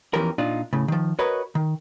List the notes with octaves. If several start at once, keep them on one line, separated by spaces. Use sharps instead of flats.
E2 E3 F3 C#4 G4 A#4
A#2 D4 D#4 F4
A2 C#3
D#3 F3
F#4 A#4 B4 C#5 D#5
D#3